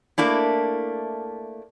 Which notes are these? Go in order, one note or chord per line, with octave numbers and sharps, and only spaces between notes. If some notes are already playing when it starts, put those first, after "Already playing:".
A3 A#3 D4 E4